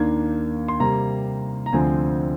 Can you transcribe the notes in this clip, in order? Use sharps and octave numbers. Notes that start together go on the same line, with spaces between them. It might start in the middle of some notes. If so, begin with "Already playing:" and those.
Already playing: D#2 D#3 A#3 D4 G#6
C6
C3 G3 A#3 A#5
A#5
D2 D3 F3 C4 G#5